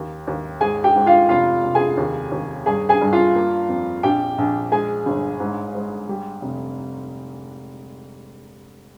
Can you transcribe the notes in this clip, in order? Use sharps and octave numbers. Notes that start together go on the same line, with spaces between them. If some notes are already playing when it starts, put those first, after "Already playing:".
Already playing: D#2
D#2
G#2 G#4 G#5
G4 G5
G#2
F4 F5
F1 F4 F5
F1
G#4 G#5
D#2
D#2
G2 G#4 G#5
G#4 G#5
G2
F4 F5
A#3
F2
A#1 G4 G5
A#1
G#3 G#4 G#5
G1
G#2
G#2
G3
F1